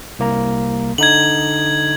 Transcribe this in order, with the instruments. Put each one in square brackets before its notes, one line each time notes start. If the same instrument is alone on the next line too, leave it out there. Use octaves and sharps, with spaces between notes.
[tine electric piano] C2 A#3 A#5
[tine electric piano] D3 D#4 [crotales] G#6 F#7